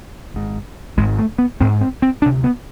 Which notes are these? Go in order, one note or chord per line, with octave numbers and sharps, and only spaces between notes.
G#1 G#2
G#1 G#2 G#3
A3
B3
G#1 C4
G#2
C4
C4
D2 C3 D4
B3